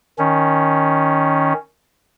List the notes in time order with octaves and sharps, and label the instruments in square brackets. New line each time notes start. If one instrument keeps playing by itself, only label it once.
[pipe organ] D#3 C#4